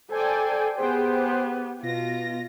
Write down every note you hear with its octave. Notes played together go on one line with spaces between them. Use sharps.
A4 C5 D5 G5 G#5
B3 G4 G#4 C5 G5
B2 F4 A#6